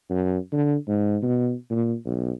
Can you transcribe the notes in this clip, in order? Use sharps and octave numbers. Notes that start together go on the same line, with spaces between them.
F#2
D3
G#2
B2
A#2
B1